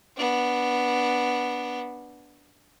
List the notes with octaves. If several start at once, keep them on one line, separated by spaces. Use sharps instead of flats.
B3 D4